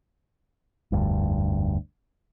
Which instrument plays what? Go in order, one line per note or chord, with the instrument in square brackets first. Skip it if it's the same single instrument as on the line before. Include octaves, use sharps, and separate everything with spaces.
[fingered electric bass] F1 D2 G2